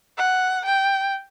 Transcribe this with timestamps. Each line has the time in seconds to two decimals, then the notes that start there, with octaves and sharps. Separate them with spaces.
0.18 F#5
0.65 G5